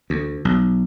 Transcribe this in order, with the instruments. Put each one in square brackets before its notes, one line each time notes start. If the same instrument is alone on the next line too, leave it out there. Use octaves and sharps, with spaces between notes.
[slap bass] D2
B1